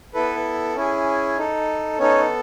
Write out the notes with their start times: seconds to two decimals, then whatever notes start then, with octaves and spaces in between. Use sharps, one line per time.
0.14 B3 E4 A4 B4
0.76 C#4 E4 G#4
1.37 D#4 A4
1.99 B3 C#4 D#4 A4 C#5